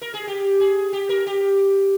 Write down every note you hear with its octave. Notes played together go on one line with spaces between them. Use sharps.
A#4
G#4
G4
G#4
G4
A#4
G4